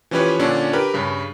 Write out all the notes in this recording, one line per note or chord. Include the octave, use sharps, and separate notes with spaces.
E3 F3 C#4 G4 B4 C#5
A#2 D3 C#4 D4
G4 A#4 B4
G2 C#3